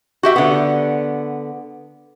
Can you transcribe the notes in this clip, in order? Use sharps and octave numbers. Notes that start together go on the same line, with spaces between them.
F#4 G4 E5
D3 B3